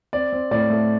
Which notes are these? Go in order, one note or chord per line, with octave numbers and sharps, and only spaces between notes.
C4 D5
C4
A2 D5
A3